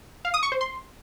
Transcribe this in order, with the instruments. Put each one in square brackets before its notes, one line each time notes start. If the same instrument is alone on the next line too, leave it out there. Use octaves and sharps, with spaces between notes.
[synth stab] F5
D#6
C#6
C5
C6